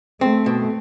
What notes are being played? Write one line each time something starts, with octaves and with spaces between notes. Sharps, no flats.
A3 C4
B2